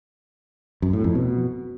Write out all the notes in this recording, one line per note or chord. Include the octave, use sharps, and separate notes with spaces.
F#2
A2
F2
B2